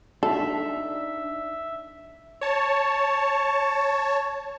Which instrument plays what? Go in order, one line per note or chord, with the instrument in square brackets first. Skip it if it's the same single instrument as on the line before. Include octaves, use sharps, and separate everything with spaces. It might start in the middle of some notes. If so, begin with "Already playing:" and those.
[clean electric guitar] D4 D#4 [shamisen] A4 [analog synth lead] E5
[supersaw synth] C#5 A5